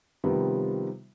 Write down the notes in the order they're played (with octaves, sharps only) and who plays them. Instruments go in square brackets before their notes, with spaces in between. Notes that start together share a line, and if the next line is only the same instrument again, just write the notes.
[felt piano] C3 D#3 F3 G3 B3